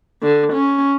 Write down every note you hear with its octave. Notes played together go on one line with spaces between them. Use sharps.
D3
C#4